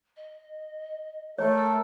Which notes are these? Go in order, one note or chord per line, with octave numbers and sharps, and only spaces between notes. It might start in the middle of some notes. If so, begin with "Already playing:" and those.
D#5
A3 A4 A#4 C#5
E6